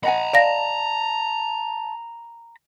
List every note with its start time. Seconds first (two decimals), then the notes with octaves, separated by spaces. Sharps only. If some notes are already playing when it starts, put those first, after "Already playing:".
0.03 D#5 F#5 G#5 A#5 B5
0.33 D5 F5 A5 A#6